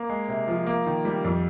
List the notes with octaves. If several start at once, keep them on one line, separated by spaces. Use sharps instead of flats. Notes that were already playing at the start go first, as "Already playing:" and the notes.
Already playing: A#3
G#3
C3
F3
A#3
D#3
G3
F2